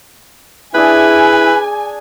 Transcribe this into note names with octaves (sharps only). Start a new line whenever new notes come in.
D4 E4 G#4 B4 G#5